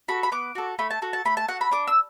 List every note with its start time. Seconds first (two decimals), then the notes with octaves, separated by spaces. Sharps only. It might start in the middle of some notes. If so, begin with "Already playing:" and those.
0.08 F#4 A4 B5
0.23 B5
0.32 B3 D6
0.55 F#4 A4
0.79 A3 B5
0.91 A5
1.02 F#4 A4
1.13 A5
1.25 A3 B5
1.37 A5
1.48 F#4 A4 F#5
1.61 B5
1.71 D4 D6
1.87 E6